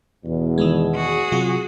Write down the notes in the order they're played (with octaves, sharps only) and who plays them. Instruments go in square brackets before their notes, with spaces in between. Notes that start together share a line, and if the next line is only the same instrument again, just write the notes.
[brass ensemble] E2 B2
[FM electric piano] D#3 E3 G#3
[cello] F#4 G#4
[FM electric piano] C3 F#3 F4